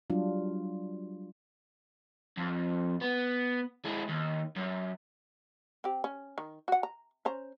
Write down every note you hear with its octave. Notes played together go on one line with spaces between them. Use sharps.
F#3 G3 D4 F4
F2
B3
G#3 E4
D#2
F#2
C4 G4
C#4
D#3
F#4 F#5
A#5
C#4 C5 A#5